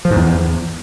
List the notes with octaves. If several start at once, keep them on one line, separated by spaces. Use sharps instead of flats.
F3
G#2
E2